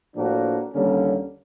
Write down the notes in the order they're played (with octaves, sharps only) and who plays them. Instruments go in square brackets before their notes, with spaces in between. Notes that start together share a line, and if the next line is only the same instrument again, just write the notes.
[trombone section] A2 F3 A#3 D4 F#4
D#2 D3 G3 A#3 C#4